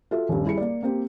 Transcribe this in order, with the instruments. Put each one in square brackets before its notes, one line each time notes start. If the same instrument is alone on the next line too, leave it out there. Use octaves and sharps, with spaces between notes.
[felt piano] F4 F#4 A4 E5
D#1 G2
G3 E4 G#4 C#7
A#3 D5
A#3 C4 G4